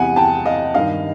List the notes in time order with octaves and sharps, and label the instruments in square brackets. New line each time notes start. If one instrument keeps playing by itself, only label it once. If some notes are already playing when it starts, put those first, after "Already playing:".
Already playing: [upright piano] E2 C3 E3 F#5 G#5
G5 A5
D#5 F5
G2 D#3 D#5 F5